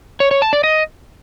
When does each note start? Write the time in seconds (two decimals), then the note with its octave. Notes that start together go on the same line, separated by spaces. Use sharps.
0.20 C#5
0.31 C#5
0.42 A5
0.53 D5
0.64 D#5